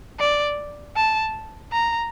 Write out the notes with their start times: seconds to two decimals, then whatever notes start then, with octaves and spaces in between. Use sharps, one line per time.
0.19 D5
0.96 A5
1.72 A#5